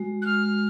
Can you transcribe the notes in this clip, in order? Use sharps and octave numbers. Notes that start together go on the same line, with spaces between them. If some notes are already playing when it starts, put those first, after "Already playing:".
Already playing: G#3 F#4
F#6
G#3 F6